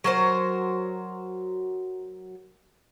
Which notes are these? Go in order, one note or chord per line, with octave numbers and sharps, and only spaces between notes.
F#3 A#4 C5